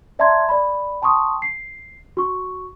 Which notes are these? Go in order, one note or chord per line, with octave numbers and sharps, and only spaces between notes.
D5 E5 A5 A#5 C6 G#6
D5 B5
G5 A5 C6 C#6 D#6
C7
F#4 C#6